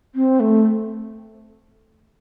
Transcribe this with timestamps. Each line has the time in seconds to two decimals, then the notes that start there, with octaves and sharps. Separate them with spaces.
0.15 C4
0.40 A3